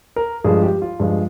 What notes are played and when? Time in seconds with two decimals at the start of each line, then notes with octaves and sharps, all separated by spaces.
0.16 A#4
0.44 G2 F3 G#3 G#4
0.63 G4
0.82 F4
1.00 G2 F3 G#3